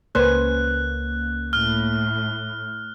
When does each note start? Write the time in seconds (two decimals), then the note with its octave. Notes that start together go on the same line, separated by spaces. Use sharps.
0.15 C#2 A#3 C#4 B4 C5 F#6
1.53 A2 F6